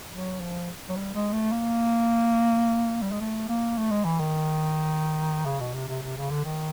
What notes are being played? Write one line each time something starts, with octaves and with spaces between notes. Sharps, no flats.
F#3
F3
F#3
G3
G#3
A3
A#3
G3
G#3
A3
A#3
A3
G#3
E3
D#3
C#3
B2
C3
C3
C3
C#3
D3
D#3